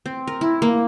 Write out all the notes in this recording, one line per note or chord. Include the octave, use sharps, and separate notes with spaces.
C4
A#4
E4
A#3